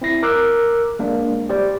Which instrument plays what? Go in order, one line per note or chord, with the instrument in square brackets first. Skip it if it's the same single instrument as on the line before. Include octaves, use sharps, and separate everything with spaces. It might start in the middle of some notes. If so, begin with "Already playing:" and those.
[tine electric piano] C4 E4 A#6 C7
A#4 D6 E6 F#6
G#3 A#3 D4
G4 C5 D5